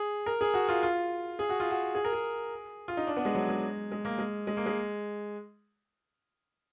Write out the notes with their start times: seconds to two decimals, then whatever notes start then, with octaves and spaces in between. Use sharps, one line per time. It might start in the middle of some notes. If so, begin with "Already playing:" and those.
Already playing: G#4
0.26 A#4
0.41 G#4
0.54 F#4
0.69 F4
0.83 F4
1.39 G#4
1.49 F#4
1.60 F4
1.70 F#4
1.95 G#4
2.05 A#4
2.13 G#4
2.88 F4
2.97 D#4
3.07 D4
3.17 B3
3.25 G#3
3.35 F#3
3.49 G#3
3.92 G#3
4.05 A#3
4.19 G#3
4.47 G#3
4.57 A#3
4.66 G#3